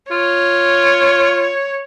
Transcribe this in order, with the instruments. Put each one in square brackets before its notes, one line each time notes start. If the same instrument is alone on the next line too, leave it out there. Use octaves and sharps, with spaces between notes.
[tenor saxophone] F4 [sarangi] C#5